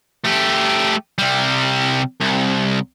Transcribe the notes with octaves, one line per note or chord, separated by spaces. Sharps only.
A3 G4
C3 G3
C2